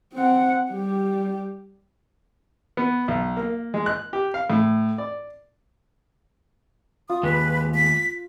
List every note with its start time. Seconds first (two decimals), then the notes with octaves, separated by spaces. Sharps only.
0.13 C4 F#5
0.72 G3 G4
2.77 B3
3.08 B1
3.37 A#3
3.74 G#3
3.86 F#6
4.13 G4
4.34 F5
4.50 A2
4.98 D5
7.09 F4 D#6
7.23 D#2 G#3 B4
7.75 B6